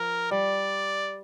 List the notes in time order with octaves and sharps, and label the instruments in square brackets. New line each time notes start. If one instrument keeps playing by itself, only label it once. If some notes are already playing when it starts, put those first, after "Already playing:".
Already playing: [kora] F3 [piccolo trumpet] A#4
[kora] G3 [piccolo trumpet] D5